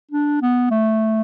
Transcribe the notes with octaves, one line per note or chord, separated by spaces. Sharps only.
D4
B3
A3